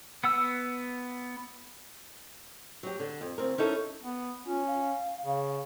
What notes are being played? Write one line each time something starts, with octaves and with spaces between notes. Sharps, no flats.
B3 F#5 E6
F#3 G4
D3
F2
D2 C4 A#4
C#4 D#4 E4 A4 A#4
B3
C#4 F4
F5
C#3